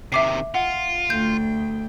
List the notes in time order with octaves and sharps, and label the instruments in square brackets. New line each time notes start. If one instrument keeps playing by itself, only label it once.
[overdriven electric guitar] C3 D#3 [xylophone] E5 D6 C7
[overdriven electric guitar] F4 [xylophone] F#5
[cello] D2 G5 [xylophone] G6